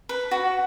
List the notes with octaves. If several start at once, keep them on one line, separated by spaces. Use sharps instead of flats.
B4
F#4